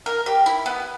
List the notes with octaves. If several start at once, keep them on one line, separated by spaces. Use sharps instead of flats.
A#4
G4
E4
B3